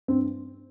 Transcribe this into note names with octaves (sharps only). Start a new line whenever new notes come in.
G2 C4